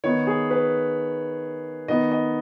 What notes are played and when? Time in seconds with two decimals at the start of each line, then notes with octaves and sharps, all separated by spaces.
0.04 D#3 B3 D#4 C#5
0.27 G#4
0.51 B4
1.88 D#3 B3 D#4 D#5
2.11 D#5